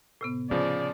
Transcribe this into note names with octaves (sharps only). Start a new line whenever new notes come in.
A2 C3 B3
C#3 F3 C4 D5